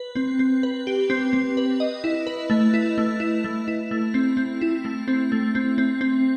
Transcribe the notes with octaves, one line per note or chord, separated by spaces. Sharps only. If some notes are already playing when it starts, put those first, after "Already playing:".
Already playing: B4
C4
C4
B4
G4
C4
C4
B4
D#5
E4
B4
A3
E4
A3
E4
A3
E4
A3
C4
C4
E4
A3
C4
A3
C4
C4
C4